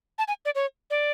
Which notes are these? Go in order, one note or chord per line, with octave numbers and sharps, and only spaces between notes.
A5
G#5
D5
C#5
D5